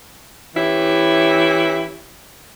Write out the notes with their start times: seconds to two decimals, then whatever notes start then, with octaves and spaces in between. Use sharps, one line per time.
0.55 E3 C#4 E4 G4